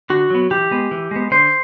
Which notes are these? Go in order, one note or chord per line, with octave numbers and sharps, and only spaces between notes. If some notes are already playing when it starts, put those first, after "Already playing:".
D3 F#4
F#3 B3
E3 G4
G#3 B3
E3
G#3 B3
D3 C5